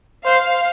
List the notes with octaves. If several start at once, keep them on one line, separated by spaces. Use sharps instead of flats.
C5 F5